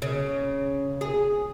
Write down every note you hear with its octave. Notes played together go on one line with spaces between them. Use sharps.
C#3
G#4